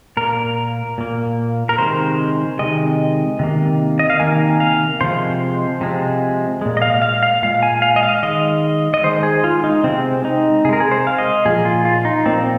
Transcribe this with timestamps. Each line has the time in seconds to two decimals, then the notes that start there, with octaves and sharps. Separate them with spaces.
0.17 A#2 A#3 A#4
0.98 A#2 A#3
1.69 A#4
1.78 C3 D#3 G#3 C5
2.59 C3 D#3 G#3 D#5
3.39 C3 D#3 A#3
3.99 D#5
4.10 F5
4.20 C3 D#3 A#3 G#5
4.60 F5
5.01 C3 F3 G#3 C5
5.81 C3 F3 G#3
6.61 A#2 G#3
6.77 D#5
6.82 F5
7.02 F5
7.23 F5
7.42 A#2 G#3 F5
7.63 G#5
7.82 F5
7.96 D#5
8.03 F5
8.23 D#3 G#3 D#5
8.94 D#5
9.03 D#3 G#3 C5
9.23 G#4
9.44 F4
9.64 D#4
9.84 C3 G#3 C4
10.25 D#4
10.65 C3 G#4
10.69 G#3 A#4
10.80 G#4
10.91 C5
11.07 F5
11.18 D#5
11.45 A#2 F3 A#3 G#4
11.65 F4
11.85 F4
12.05 D#4
12.25 A#2 F3 A#3 C4